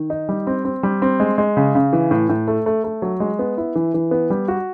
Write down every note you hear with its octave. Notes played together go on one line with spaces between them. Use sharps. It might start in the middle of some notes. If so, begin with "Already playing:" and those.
Already playing: D#3
D#4
G3
C4
C4
G3
C4
G#3
G#3
C#3
C#3
E3
A2
A2
A3
A3
A3
F#3
G#3
B3
E4
E3
E3
B3
G3
F#4